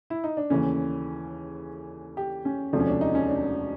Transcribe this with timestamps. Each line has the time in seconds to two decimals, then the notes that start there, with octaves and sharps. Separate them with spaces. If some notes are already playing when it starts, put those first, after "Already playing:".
0.10 E4
0.24 D#4
0.37 D4
0.50 D#2 C#3 E3 A3 C#4
2.17 G4
2.45 C#4
2.73 E1 D2 C3 F3 A3 D4
2.80 C#4
2.87 D4
3.01 D#4
3.15 C#4
3.29 D4